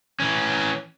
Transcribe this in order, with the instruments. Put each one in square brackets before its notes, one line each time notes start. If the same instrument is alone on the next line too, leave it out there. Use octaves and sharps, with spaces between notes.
[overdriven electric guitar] E3 C#4